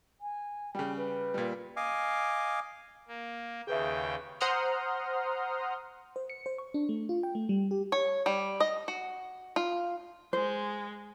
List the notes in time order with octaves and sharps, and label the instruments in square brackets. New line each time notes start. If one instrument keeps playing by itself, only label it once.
[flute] G#5
[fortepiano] C#3 G3 [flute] G5
[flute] B4
[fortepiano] A#2 G3
[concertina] D#5 F5 G#5 D6
[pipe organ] A#3
[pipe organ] D#2 C#3 G5 [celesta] G#4 B4 E5
[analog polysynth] C5 F#5 A#5 C6 D#6 F6
[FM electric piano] C5
C#7
C5
C#6
D4
A3
F4
G5
A3
G3
G4
[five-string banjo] C#5
G3
D#5
F#4
F4
[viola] G#3 [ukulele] C5